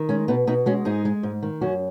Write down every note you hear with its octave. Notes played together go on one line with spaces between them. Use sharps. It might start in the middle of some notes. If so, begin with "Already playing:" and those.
Already playing: D#3
G#3 C#4
B2 B3 D#4
B2 B3 D#4
G#3 C#4 F#4
G#2 D#4 G#4
G#3
G#2
D#3
F#2 C#4 F#4